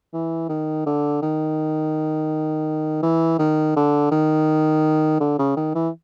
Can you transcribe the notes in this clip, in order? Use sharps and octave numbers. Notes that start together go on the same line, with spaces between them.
E3
D#3
D3
D#3
E3
D#3
D3
D#3
D3
C#3
D#3
E3